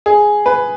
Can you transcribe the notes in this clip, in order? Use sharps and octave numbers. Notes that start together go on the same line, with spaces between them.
G#4
B4